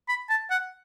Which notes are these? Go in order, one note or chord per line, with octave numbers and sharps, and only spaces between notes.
B5
A5
F#5